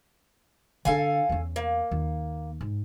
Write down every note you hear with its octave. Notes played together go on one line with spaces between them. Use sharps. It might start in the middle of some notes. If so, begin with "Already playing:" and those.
D3 D4 A4 F5 G#5
E2 C#4
A#3
D#2
G#2